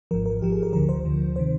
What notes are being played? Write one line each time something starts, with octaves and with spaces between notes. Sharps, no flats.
G#1 G#2 F3 A#4
A#4
G#1 G#2 F3 G4
G#4
A#4
D2 D3 F3 A#4
C5
D2 D3 F3
C3 D#3 C5